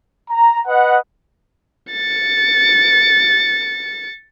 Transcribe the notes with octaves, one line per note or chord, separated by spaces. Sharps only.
A#5
B4 D#5 F#5
A6 C#7